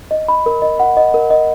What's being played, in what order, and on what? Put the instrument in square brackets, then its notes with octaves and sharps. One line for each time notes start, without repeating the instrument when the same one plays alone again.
[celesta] D#5
B5
A#4
D#5
F#5
D#5
A#4
D#5